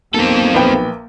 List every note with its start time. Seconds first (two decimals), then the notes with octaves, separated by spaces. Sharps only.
0.14 B1 A#3 C4 A4
0.55 A#1 B4 G5